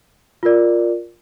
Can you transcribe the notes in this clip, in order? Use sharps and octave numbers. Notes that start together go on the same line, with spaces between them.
F4 A#4 D5